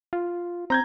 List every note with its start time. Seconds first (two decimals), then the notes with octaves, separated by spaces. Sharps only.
0.13 F4
0.70 C4 A#5 G6 G#6